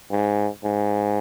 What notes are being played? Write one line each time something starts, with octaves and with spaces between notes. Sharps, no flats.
G#2
G#2